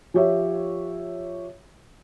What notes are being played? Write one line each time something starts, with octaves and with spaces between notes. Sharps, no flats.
F3 G4 C#5 E5